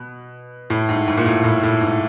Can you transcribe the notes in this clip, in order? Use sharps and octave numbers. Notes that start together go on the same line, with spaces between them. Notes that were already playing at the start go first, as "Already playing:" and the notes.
Already playing: B2
A2
G#2
G#2
A#2
A2
A2
A2
G#2